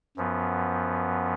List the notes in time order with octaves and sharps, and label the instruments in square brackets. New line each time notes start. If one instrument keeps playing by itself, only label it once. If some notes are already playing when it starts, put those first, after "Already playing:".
[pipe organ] F#2 F3 B3